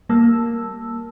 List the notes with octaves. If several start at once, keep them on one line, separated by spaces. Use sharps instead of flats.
G3 A#3 A5 E6